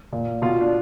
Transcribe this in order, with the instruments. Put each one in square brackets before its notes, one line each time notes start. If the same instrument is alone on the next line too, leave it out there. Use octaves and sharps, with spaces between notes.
[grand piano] A#2
B2 F4
D4